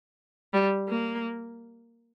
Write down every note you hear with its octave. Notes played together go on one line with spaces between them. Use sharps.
G3
A#3